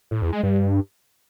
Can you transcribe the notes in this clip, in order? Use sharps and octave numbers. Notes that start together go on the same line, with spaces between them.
A2
E2
G#3
G2